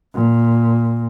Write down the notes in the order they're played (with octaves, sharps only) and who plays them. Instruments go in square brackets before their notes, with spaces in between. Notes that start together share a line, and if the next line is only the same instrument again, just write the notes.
[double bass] A#2